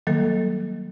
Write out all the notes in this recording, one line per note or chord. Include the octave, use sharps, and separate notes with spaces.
D#3 F#3 G3 A#3 A4